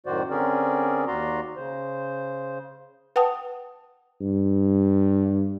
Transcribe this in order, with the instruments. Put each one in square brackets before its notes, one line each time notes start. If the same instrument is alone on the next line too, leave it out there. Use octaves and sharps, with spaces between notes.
[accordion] F#2 A2 D#3 F#4 C5 D5
D3 C4 C#4 G#4 A#4 D5
D#2 F#4 D5 A#5 C6
C#3 C5
[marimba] B4 F#5 G5 A5 D#6
[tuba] G2